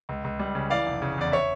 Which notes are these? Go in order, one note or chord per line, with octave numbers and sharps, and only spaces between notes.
C#2
C#2
G3
C#3
E3 D5 F5
F1
C#3
E2 D5
C#5 E5